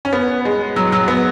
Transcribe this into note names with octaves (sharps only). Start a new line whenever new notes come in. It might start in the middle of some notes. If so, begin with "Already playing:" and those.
C#4
B3
G#3
F#3
F#3
B3